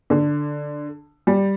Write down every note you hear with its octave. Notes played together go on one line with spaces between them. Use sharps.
D3
G3